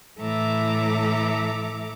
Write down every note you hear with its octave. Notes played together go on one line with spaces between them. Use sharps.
A2 E3 A4 E5 A#5 D6